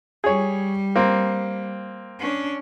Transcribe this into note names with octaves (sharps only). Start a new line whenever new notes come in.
G3 G#4 C#5
A#3 C4
C#4 D4